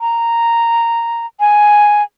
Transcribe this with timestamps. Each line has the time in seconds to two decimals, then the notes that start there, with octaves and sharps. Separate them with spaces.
0.01 A#5
1.40 G#5